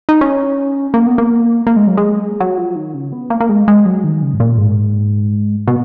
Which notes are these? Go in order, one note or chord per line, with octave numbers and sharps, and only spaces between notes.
D#4
C#4
A#3
B3
A#3
A#3
G#3
F#3
G#3
F#3
F3
D#3
C#3
B3
A#3
A#3
G#3
G#3
F#3
D#3
C#3
G#2
A#2
G#2
B2